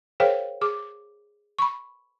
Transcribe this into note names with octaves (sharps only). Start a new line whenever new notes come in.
G#4 A#4 C5 C#5 F5 G5
G#4 D6
B5 C#6